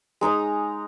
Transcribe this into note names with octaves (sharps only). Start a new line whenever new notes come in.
G#3 D#4 A#5 D#6